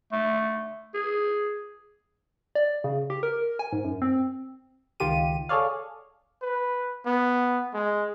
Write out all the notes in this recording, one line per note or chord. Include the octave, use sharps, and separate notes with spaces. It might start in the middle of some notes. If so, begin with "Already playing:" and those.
A3
G#4
D5
C#3
G4
A#4
G#5
G#2
F#2
C4
C#2 D#3 F4 G4 D#7
G#4 A4 C#5 D5 F5
B4
B3
G#3